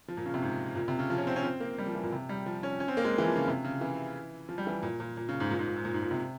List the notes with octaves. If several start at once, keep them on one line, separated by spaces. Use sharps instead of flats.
F3
A#2
C#3
C3
G#2
A#2
C3
C#3
F3
C#4
C4
C#4
C4
A#3
G3
F3
E3
A#2
C3
G3
F3
C#4
C#4
C4
A#3
G#3
E3
F3
C#3
C3
C#3
E3
F3
G3
E3
A#2
A#2
A#2
C#3
G#2
A#2
G#2
A#2
G#2
A#2
G#2
A#2
C3